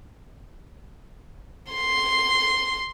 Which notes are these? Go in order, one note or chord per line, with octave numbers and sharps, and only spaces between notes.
C6 C7